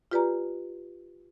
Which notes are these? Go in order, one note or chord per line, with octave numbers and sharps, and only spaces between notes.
F4 G4 B4 D5 G#5 A#5